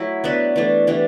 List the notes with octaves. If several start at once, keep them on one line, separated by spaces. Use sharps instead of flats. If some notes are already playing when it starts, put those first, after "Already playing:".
Already playing: F#3 A3 E4
B3 D4 F#4 B4
E3 A3 D4
E3 G3 D4